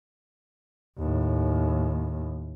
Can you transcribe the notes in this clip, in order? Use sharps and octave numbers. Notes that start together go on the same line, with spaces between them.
D#2 A2